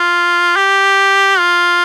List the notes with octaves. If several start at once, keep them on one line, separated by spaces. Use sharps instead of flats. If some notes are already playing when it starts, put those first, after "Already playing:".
Already playing: F4
G4
F4